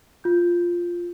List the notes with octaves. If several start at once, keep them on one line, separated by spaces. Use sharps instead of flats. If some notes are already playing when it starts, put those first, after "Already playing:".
F4 G6